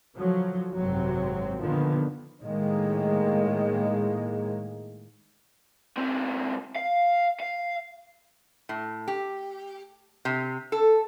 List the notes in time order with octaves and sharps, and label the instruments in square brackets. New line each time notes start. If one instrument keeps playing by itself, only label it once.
[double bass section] D3 F3 F#3
G#1 F#2 C3 F#3 C4
A#2 D3 D#3 F3 B3
A2 D#3 G#3 A#3
[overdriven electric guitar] C#2 C4
F5
F5
[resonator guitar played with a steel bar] A2
G4
C3
A4